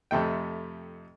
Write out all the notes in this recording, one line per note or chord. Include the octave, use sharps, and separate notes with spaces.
F2 C3 A3 G5